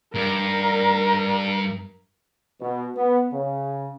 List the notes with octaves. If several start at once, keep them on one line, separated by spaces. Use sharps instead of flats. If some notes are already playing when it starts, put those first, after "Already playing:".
G2 A#4
B2
B3
C#3